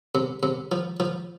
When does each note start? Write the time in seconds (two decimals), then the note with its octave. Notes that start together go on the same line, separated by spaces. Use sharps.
0.15 C3
0.43 C3
0.72 F3
1.00 F3